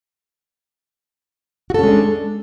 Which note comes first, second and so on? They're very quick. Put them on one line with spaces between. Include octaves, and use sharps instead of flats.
F#4 A4 C#4 G#3 D4